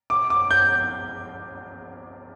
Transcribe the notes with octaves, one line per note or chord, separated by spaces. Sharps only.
D6
D6
G6